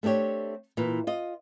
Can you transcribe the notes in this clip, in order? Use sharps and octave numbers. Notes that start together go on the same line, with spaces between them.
A3 C4 D4 G4 C#5
A#2 E3
F4 D#5